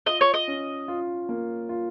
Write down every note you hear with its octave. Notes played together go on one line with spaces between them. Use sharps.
F4 D#5
C#5
D#5
C#4
F4
A#3
F4